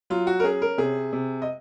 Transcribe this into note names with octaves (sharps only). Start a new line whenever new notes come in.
F#3 F4
F#4
A#4
C#4 G#4
A#4
C3 G#4
C3
D#5